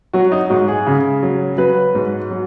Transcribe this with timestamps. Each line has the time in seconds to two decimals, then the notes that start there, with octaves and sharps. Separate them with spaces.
0.13 F#3 F#4
0.32 D#4
0.50 G#2 F#4
0.68 G#4
0.86 C#3
1.23 F#3
1.58 F#3 B4
1.95 G#2
2.31 F#3